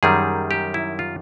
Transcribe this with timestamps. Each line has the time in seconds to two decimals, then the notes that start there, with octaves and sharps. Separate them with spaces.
0.03 F#2 D#3 G3 G#4
0.51 G4
0.74 E4
0.99 F4